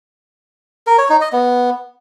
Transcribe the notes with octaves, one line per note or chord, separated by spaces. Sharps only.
A#4
C#5
D#4
D#5
B3